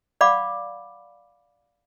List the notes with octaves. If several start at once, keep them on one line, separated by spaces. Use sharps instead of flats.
D5 F5 F#5 B5 D6